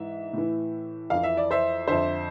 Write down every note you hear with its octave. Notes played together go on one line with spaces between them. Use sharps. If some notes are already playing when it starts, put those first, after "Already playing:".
Already playing: G#2 E3 E5
A2 E3
F2 E3 F5
E5
D5
C5 E5
F2 D3 C5 E5